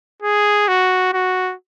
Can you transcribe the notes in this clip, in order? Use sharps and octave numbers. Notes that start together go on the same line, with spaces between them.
G#4
F#4
F#4